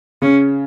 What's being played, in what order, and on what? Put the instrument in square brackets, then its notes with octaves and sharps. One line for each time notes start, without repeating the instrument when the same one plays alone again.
[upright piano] C#3 [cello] C#4